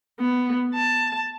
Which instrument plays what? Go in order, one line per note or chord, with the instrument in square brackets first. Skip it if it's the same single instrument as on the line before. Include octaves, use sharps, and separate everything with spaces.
[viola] B3
A5